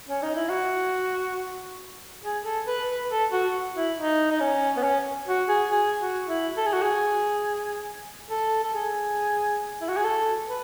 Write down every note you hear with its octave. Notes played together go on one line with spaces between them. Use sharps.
C#4
D#4
E4
F#4
G#4
A4
B4
B4
A4
F#4
E4
D#4
D#4
C#4
B3
C#4
F#4
G#4
G#4
F#4
E4
A4
G#4
F#4
G#4
A4
A4
G#4
E4
F#4
G#4
A4
B4